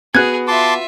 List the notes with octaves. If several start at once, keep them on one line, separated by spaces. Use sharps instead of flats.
B3 F#4 G#4 F#6 G#6
F4 E5 A5 C6 D6